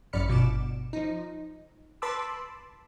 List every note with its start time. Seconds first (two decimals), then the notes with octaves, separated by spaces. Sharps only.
0.13 A1 F#2 D5 B5 F6 C#7
0.28 G1 B2 D6 E7
0.93 F3 D#4
2.02 B4 A5 B5 C6 D6 E6